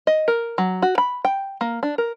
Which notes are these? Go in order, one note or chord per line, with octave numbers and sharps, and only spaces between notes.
D#5
A#4
F#3
F#4
B5
G5
A#3
D4
A#4